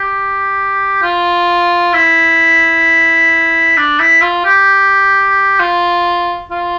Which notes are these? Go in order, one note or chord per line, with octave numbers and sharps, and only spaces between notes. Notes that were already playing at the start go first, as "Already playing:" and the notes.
Already playing: G4
F4
E4
D4
E4
F4
G4
F4
F4